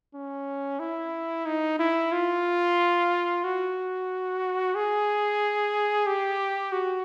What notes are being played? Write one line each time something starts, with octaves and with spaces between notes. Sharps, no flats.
C#4
E4
D#4
E4
F4
F#4
G#4
G4
F#4